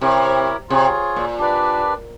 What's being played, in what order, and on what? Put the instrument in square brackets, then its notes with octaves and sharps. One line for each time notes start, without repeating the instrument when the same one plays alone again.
[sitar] C3 [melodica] E4 G4 A#4 C#5
[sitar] C3 [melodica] F4 G#4 C#5
[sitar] A#2
[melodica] D4 G4 B4 D5